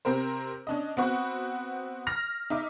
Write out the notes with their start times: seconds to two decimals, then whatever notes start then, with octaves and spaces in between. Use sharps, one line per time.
0.05 C3 C4 A#4 C5
0.67 C#4 D4 D#5
0.97 B3 C4 F#4 C#6
2.07 F6 A#6 F7
2.50 D#4 E5 D6